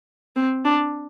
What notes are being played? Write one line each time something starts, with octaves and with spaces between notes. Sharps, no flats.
C4
D4